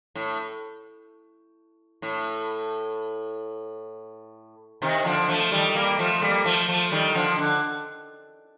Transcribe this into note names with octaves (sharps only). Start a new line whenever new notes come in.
A2
A2
C3 D#3
D3 F3
F3 A3
D#3 G3
G3 A#3
F3 A3
G3 A#3
F3 A3
F3 A3
D#3 G3
D3 F3
D3